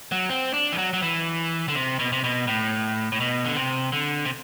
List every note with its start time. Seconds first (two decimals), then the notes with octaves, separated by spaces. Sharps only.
0.12 F#3
0.29 C4
0.54 D4
0.72 E3
0.78 F#3
0.93 F#3
1.02 E3
1.68 D3
1.75 C3
1.99 B2
2.12 C3
2.24 B2
2.47 A2
3.12 A2
3.20 B2
3.45 D3
3.56 C3
3.92 D3
4.25 C3